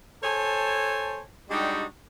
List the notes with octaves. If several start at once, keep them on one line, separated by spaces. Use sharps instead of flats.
A4 C5 C#5 G#5 A5
G3 G#3 D4 D#4 F#4 G4